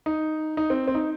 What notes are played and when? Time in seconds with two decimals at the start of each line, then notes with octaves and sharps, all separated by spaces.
0.06 D#4
0.57 D#4
0.70 C4
0.88 C4
0.95 D#4